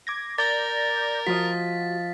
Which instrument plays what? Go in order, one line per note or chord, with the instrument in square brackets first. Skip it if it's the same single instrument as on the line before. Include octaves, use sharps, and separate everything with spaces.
[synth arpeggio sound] D6 G#6 A#6
[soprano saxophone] A#4 [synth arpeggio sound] D5 G6 A#6 [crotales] A6
[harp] F3 F4 D#5 [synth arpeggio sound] F#4 [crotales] B6